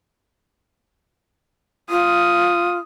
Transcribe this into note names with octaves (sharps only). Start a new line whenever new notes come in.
F4 D#6